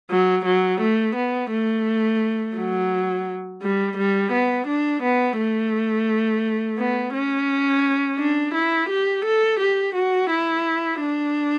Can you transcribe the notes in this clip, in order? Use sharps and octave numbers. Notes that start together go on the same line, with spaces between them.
F#3
F#3
A3
B3
A3
F#3
G3
G3
B3
D4
B3
A3
B3
C#4
D4
E4
G4
A4
G4
F#4
E4
D4